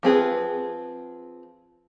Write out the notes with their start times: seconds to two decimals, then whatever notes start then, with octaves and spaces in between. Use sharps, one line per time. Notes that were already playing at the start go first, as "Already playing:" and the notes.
0.03 F3 C4 G#4 B4